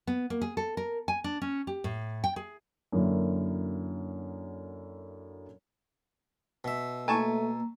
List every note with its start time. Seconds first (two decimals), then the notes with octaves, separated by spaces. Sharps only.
0.07 B3
0.30 A#3
0.42 G#4
0.57 A4
0.77 A#4
1.08 G#5
1.24 D4
1.42 C#4
1.67 G4
1.84 A2
2.24 G5
2.36 G#4
2.92 F#2 D3 F#3 A#3 E4
6.64 B2 E5
7.08 A3 A#3 G#5 A5 C#6